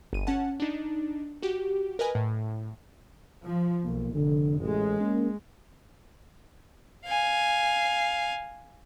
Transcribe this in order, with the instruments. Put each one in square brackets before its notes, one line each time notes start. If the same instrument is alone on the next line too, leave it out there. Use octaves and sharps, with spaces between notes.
[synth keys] G1 D#7
C#4 F#5 A5
D4 D#4
F#4 G4
A#4 B4 D#5 G#5
A2
[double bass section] F3
[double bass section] B1 [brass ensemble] A#3
[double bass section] F1 [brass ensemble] D3
[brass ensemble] A1 [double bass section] G#3
[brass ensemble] A#3 C#4
[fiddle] F5 G#5